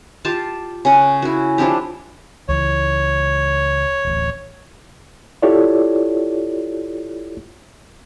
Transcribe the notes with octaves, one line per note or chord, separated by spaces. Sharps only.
F4 G4 A5
C#3 F#5
E4 F#4
F3 D4 E4 G4
C#2 E3 C#5
D1 A1
E4 F4 G4 A4 C#5 D5